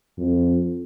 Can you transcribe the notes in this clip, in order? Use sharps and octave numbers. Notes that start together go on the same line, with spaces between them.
F2